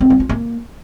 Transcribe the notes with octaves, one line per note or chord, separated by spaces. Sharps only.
C4
G3
F4
A#3